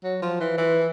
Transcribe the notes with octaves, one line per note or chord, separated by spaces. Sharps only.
F#3
F3
E3
E3